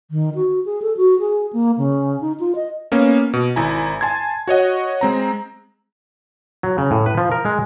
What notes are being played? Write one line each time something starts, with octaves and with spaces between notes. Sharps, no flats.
D#3
F#4
G#4
A4
F#4
G#4
A#3
C#3
D#4
F4
D#5
A#3 B3 C#4
B2
G#1 E4 G#5 A#5
G#5 A5 C6 G#6
F#4 C#5 D#5 F#5
G#3 C4 A#5
F#3
C#3
A2
B4
F3
A#4
G#3